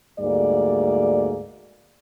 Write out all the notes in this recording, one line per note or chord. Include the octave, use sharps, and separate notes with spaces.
D2 G#2 G3 A#3 D5